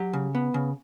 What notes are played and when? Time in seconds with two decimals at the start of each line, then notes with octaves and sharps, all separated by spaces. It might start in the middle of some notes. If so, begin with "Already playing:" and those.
Already playing: F#3 G4
0.13 C#3
0.35 B3
0.54 C#3